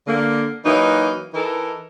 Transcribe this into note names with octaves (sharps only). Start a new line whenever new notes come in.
D3 A#3
E3 F#3 A#3 D#4
E3 D#4 E4 A4 A#4